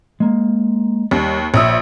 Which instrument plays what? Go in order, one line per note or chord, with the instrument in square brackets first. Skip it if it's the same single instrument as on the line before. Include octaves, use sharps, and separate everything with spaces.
[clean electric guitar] G#3 A#3
[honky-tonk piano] D#2 [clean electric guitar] G3
[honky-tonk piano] A#1 D#6 E6 [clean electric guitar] C#5 E5